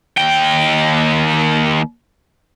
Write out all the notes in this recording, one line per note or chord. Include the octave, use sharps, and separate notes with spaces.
D#2 G5